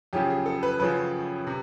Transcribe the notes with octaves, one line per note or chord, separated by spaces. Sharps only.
F#2 C#3 F3 G4
G#4
A4
B4
F#2 C#3 F3 B4
C3